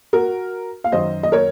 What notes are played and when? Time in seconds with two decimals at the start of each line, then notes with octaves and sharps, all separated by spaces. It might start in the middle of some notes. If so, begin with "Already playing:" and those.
0.13 F#4 A#4
0.84 F5
0.92 F#2 D#3 F#3 C5 D#5
1.23 D#5
1.32 A#4 C#5